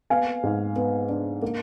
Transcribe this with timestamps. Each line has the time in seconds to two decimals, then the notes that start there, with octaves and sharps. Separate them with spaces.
0.10 B3 F5 G#5
0.43 G#2
0.76 B3
1.09 D4
1.42 A#3